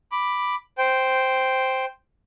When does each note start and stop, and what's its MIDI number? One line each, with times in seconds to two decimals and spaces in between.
0.12 0.55 83
0.12 0.55 86
0.78 1.85 72
0.78 1.85 79